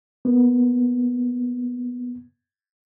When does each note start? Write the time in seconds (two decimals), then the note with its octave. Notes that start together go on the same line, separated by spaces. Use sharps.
0.25 A#3 B3